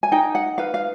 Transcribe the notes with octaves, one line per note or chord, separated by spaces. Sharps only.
G#5
D#4 G5
F#5
B4 F5
F5